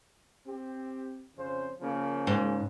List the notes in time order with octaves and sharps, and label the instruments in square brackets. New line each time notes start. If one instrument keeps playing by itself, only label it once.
[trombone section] C4 G4
F2 C#3 C5
C#3 F3 A#3
[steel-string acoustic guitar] G#2